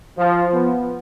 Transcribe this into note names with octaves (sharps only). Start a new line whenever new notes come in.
F3
B3